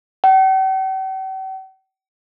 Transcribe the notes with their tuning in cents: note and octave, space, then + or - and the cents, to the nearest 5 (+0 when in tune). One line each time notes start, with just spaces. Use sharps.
G5 -45